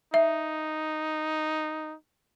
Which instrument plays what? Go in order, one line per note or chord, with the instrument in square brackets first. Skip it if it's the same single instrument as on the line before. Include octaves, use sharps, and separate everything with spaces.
[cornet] D#4 [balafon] E5